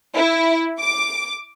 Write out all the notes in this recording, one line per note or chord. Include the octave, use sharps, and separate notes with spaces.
E4
D6